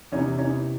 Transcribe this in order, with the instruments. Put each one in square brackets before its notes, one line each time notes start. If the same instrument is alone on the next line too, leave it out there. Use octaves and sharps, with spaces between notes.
[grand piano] E2 C3 E3 [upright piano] C#4 D#4
[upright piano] C#4 D#4